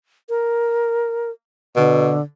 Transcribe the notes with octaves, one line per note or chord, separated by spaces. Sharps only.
A#4
B2 D3